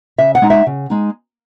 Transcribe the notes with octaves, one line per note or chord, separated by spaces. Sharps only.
C#3 E5
F#5
G#3 D#4
E5
C#3
G#3 D#4